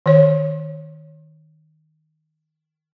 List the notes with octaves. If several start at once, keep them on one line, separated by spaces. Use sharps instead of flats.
D#3 C#5